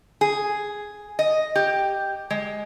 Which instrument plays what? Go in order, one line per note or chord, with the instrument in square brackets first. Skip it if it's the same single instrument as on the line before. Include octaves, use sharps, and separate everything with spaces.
[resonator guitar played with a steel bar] G#4
D#5
G4
G#3